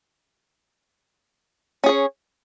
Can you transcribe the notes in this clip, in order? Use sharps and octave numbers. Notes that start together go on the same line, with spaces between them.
C#4 G#4 C#5